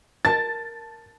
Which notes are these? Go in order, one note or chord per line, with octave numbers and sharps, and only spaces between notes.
A#4 A5 A6